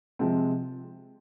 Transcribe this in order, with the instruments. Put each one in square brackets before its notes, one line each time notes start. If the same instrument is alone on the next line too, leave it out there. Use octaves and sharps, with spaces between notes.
[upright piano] C3 F3 G#3 C4